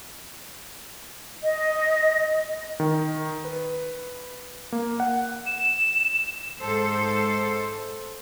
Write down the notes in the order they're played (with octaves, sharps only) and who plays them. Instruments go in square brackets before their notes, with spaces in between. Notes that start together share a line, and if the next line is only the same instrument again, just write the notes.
[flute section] D#5
[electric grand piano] D#3
B4
A#3
F#5
[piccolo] E7
[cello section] G#2 A4 C5